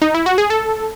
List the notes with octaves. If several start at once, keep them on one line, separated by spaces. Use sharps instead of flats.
D#4
E4
F#4
G#4
A4